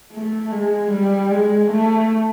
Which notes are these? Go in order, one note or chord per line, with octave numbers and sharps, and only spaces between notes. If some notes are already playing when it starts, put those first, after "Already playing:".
A3
G#3
G3
G#3
A3